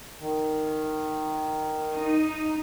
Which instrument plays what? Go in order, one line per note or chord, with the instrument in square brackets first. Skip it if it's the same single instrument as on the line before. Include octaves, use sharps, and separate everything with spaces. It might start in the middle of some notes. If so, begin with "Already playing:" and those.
[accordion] D#3
[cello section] D#4